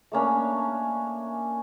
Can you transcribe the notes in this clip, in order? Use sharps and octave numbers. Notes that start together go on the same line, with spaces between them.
A3 A#3 C#4 D4